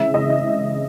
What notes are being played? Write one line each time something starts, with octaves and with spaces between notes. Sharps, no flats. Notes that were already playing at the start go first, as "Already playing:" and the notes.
Already playing: C#3 E3 G#3 E5
D#5